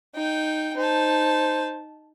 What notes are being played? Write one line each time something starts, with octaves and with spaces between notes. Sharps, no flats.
D#4 G5
D#4 C5 A5